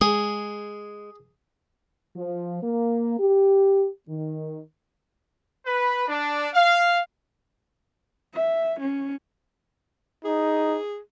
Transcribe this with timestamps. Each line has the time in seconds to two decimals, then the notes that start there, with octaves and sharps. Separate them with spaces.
0.01 G#3 G#4
2.16 F3
2.63 A#3
3.19 G4
4.08 D#3
5.66 B4
6.08 D4
6.53 F5
8.34 E5
8.80 C#4
10.25 D#4 G#4